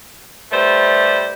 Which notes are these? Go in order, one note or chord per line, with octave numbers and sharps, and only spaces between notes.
G3 A3 B4 C5